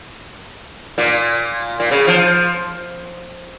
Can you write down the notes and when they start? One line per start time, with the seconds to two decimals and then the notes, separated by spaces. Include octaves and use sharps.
0.98 A#2
1.80 A#2
1.91 C#3
2.07 F3